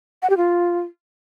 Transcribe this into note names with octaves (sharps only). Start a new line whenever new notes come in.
F#5
G4
F4